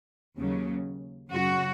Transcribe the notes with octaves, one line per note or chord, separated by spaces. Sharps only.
D#2 C#3 F#3
F#2 C#3 F#3 F#4